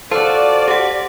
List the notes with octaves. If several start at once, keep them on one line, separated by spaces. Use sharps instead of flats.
F4 F#4 A4 C5 D5 A5
G4 F#5